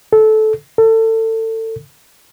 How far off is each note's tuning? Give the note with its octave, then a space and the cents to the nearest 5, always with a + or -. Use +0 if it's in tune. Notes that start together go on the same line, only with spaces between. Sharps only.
A4 -15
A4 +30